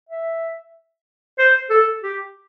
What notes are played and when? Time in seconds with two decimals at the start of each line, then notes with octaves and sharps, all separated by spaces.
0.09 E5
1.39 C5
1.70 A4
2.03 G4